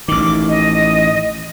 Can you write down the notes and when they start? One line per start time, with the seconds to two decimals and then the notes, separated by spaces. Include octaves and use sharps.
0.08 A1 D#3 D6
0.49 D#5